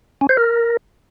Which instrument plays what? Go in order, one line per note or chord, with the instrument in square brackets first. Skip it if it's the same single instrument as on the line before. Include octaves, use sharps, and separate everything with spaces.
[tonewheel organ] C#4
C5
A#4